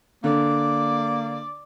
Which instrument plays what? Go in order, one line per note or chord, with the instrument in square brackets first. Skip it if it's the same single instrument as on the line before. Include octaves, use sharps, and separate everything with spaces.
[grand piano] D3 [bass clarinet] A#3 [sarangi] D5